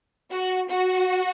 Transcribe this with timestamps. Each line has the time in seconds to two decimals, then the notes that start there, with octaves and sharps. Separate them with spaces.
0.31 F#4
0.70 F#4